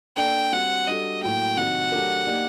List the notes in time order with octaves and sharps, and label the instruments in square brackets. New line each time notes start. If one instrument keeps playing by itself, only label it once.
[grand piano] A#3 D4 A4 D5 [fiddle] G5
[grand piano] G3 C4 F#4 [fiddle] F#5
[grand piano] G3 D4 F#4 A4 [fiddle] D#5
[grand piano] A2 F#3 A#3 [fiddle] G5
[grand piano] C3 D#3 F#3 [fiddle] F#5
[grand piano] F#3 A3 D4 G4 A#4
A#3 D#4 G4 D5